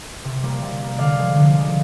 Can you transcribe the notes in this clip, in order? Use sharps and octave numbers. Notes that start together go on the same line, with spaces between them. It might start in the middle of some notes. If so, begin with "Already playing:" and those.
C3
G3 A#3
C3
G3 A#3
D3 D5 F5
F3 G#3
D3
F3 G#3